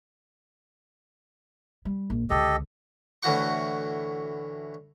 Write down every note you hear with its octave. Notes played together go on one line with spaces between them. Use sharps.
G3
A#1
C#2 D3 G4 A4 D#5
D2 A2 E3 F#4 F#5 C#6